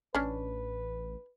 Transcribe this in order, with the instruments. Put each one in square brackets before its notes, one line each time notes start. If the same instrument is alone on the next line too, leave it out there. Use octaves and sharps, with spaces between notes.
[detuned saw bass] A1 [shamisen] C#4 D4 [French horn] B4